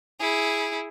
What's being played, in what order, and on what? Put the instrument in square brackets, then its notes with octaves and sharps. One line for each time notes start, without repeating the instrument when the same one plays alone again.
[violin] E4 G#4